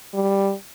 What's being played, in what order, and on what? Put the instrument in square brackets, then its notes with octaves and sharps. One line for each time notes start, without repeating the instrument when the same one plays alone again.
[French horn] G3